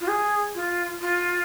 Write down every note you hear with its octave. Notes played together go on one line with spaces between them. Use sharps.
F4
G#4
F4
F4